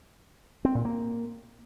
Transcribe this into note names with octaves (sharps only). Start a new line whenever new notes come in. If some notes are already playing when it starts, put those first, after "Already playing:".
C4
A#2
A#3